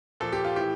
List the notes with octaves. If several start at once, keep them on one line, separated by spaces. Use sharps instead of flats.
A#2 F3 A4
G4
F4
A2 E3 G4